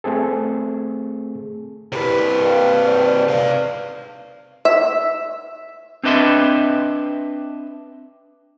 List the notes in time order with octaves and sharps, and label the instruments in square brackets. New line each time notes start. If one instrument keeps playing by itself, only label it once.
[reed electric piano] A3 C4 G#4 A4
[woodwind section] C2 [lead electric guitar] C3 B4
[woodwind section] F5 G5
G#2 C5 D5
[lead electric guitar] B4 F5
[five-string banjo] E5
[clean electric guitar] C4 D4 B4 D#5 E5 C6